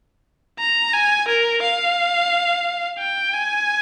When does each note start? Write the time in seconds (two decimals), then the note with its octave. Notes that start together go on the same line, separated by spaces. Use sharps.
0.59 A#5
0.93 G#5
1.28 A#4
1.62 F5
2.99 G5
3.33 G#5